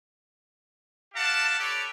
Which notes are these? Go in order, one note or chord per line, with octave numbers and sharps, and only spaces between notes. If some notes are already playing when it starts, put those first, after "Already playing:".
G4 F5 F#5 A5
G4 A4 B4 C#5 D5